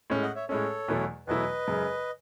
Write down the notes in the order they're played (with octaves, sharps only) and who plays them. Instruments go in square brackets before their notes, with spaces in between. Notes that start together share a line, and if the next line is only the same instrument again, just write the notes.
[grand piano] A2 G#3 C#4
[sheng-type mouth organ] D#5 F#5
C#5 E5
[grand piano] A2 G#3 C#4 [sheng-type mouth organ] A4 C#5
[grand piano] E2 B2 F#3 A3 E4
[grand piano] E2 B2 F#3 A3 E4 [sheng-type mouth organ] B4 D#5
[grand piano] F#2 C#3 G#3